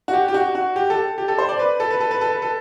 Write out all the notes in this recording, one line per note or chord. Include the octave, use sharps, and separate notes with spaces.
F#4
G4
G4
F#4
F#4
G4
A4
G4
A4
C5
D5
B4
A4
B4
A4
B4
A4
B4
A4